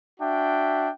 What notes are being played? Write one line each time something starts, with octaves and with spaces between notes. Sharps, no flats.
D4 F#4 E5 G5